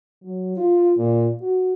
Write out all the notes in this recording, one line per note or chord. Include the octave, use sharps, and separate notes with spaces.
F#3
F4
A#2
F#4